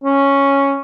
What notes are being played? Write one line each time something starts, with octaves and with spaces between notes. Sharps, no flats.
C#4